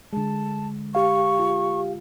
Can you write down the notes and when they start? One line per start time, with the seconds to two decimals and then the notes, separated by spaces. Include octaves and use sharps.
0.13 D3 G#3 A5
0.95 G4 F5 C#6
1.39 F4